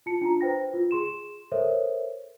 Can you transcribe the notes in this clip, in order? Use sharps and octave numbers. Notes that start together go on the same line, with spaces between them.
F4 A5 C#7
D4 F4 A#5
B4 C5 G5 A#6
F4
G#4 C6 E7
A4 A#4 C5 C#5 E5